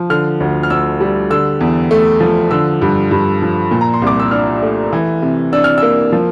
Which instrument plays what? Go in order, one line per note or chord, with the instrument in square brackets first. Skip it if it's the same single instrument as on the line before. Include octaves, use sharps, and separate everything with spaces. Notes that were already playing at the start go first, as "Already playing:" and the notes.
Already playing: [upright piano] F3
D3 F6
D2
F6
D2 E6
G3
D3 E6
E2
A3
F3
D3 E6
G2
G2
F3
A#2
A#5
C6
C2 D6
E6
D4 F6
A3
E3
C3
D4 E6
F6
A#3 E6
F3